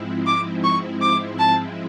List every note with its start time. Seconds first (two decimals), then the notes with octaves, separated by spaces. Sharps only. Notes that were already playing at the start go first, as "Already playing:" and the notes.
Already playing: G#2 F3 G#3 C4 E4
0.26 D6
0.63 C#6
1.02 D6
1.39 A5